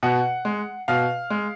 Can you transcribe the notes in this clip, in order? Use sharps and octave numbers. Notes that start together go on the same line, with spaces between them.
B2 F#5
G#3
B2 F5
G#3